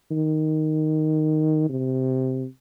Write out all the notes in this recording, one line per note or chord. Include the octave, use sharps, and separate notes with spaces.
D#3
C3